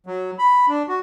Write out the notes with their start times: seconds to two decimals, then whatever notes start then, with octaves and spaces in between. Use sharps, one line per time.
0.06 F#3
0.39 B5
0.68 D4
0.88 F#4